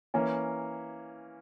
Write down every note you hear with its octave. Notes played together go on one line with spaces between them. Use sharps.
E3 A#3 C#4